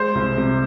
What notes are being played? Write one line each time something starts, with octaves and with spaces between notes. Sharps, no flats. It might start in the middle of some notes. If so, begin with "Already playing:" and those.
Already playing: G#3 C5
C2
C3